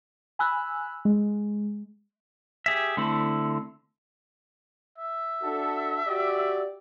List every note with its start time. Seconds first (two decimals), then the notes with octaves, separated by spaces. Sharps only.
0.39 G#5 B5 E6 F#6
1.05 G#3
2.66 G4 G#4 E5
2.97 D3 A3 C4 E4
4.98 E5
5.43 D4 F#4 A4
6.06 F#4 G4 D5